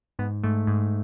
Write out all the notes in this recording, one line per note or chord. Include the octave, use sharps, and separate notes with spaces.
G#2 B3
G#2 A3
G#2